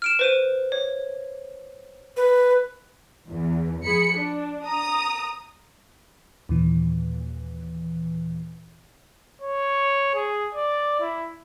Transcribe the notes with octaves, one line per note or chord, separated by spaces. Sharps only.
F6 D7 E7
B4 C5 D#7
C#5
B4
E2
F3 G#4 B5 C#7
D4
A#5 D#6
D#2 A#2 E3
C#5
G#4
D5
E4